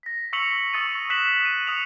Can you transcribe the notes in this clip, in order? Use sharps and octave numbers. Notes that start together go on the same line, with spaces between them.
A#6 B6
C#6 E6 B6 C#7 F7 F#7
C#6 D#6 E6 A6 C#7 D#7
D#6 F#6 B6 E7 F#7
D#7
D#6 C#7 F7